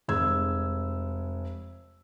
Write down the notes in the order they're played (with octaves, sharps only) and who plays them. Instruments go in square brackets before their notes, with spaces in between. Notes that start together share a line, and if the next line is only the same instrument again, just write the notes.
[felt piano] F1 G#3 E6 G#6